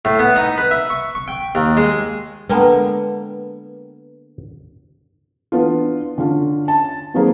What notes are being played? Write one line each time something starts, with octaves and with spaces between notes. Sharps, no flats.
A2
B3
D#4
B4
E5
C#6
C#6
G5
D#2
G#3
D3 G#3 A#3 B3 A#4 B4 G5
E3 B3 D4 F4
D3 C#4 F4
A5
D#3 F#3 A#3 C4 G#4 A#4